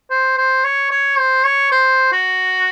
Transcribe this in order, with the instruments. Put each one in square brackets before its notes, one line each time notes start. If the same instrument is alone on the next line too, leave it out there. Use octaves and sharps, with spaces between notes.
[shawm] C5
C5
C#5
C#5
C5
C#5
C5
F#4